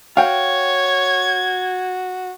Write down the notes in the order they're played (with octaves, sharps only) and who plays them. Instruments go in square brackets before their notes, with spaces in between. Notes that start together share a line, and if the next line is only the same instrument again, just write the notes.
[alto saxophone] F#4 [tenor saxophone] C#5 [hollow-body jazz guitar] F5 G5 [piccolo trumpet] G#6